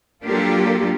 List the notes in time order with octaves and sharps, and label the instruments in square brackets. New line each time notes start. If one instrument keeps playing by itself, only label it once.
[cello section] F#3 A#3 D4 F4 G4 A4